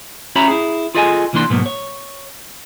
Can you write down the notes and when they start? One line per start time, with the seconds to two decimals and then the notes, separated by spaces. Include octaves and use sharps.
0.36 C#4 F#4 C#5 E5 A#5 B5
0.48 E4 G#4
0.95 F4 G#4 A4 D#5 F#5 G#5
1.33 C2 E3 A#3 D4 C6
1.50 G#2 B2 F#3 A#3 B3
1.66 C#5